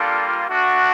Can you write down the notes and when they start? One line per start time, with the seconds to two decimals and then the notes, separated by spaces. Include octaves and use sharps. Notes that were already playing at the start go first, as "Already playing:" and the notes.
Already playing: G3 A#3 D4 F4 A4
0.47 A3 D4 F#4